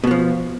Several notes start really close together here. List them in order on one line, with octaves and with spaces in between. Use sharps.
B2 B3 F3